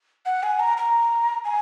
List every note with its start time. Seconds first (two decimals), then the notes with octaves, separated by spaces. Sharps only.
0.26 F#5
0.43 G#5
0.60 A#5
0.77 A#5
1.45 G#5